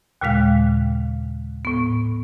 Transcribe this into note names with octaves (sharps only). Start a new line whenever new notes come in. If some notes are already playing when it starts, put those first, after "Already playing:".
D#2 A#2 C#3 G#3 F5
A2 B3